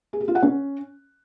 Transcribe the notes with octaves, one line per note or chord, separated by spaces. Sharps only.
G#4
G4
F4
F#5
C#4